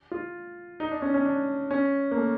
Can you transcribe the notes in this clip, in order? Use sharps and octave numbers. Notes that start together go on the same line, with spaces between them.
F4
D#4
D4
C#4
C#4
D4
C#4
A#3
A3